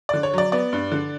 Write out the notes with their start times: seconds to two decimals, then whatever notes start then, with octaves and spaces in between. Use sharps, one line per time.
0.09 D3 D5
0.23 C#5
0.33 F#3 D5
0.52 B3 D5
0.73 G2
0.92 D3